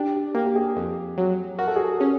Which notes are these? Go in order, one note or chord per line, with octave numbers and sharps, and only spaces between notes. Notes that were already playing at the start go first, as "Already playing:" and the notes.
Already playing: D4 G4
G4
A#3 G4
G4
G#4
F2
F#3
F#4 A#4
A4
G#4
A4
C#4 G#4